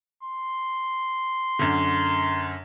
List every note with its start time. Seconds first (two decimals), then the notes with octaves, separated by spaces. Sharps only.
0.23 C6
1.59 F#2 D3